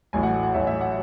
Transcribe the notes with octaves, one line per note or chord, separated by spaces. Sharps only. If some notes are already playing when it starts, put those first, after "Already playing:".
A1 A2 F#3 G#5
F#5
F#5
A1 A2 F#3 E5
E5
F#5